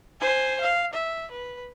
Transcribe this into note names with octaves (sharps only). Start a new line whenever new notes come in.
C5 G#5
F5
E5
B4